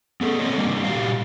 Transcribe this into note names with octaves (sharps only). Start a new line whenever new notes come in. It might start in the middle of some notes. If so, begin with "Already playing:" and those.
B3 G#4 A4
A3 A#3 C4 C#5 D#5
G3 A#3 D4
A#2 F#4 G4 C5 F5